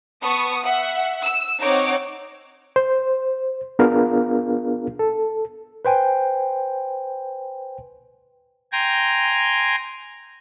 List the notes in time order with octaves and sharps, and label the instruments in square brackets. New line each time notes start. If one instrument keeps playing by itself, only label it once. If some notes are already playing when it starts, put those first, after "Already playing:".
[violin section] B3 A5 C#6 D#6
E5 F#5
E6
C4 D#4 C#5 F#5 D6 D7
[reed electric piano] C5
B3 D4 F4 G#4 A#4 F5
A4
[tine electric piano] B4 C5 G5 G#5
[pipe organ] G5 G#5 A#5 C6